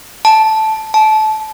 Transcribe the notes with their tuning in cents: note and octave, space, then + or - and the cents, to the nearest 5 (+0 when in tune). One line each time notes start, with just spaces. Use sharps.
A5 -5
A5 -25